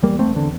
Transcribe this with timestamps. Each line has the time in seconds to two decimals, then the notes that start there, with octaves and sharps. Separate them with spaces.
0.03 E2 G3 A#3
0.19 A3 C4
0.27 E2
0.36 D3